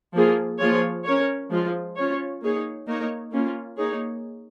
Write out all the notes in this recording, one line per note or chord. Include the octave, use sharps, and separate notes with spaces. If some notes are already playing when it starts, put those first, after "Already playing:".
F3 A#3 F4 G#4
F3 A#3 F4 G#4 C#5
C#4 A#4 C#5
F3 G#3 F4
C#4 F4 C#5
A#3 D#4 G#4 C#5
A#3 D#4 A#4 C#5
A#3 C#4 F4
A#3 D#4 G#4 C#5